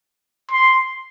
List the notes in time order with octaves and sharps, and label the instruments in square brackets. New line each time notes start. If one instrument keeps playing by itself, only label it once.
[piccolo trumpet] C6